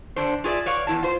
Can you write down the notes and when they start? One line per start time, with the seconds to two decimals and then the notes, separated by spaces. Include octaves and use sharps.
0.16 D3 D4 C5
0.44 F4 G#4 B4 D5 E5
0.66 B4 C#5 D5 F5
0.87 E2 E4 A5
1.03 F4 C5